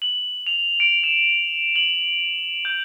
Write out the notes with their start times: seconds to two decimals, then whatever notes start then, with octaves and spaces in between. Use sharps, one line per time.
0.02 F#7
0.47 F7
0.80 D7
1.04 E7
1.76 F#7
2.65 G6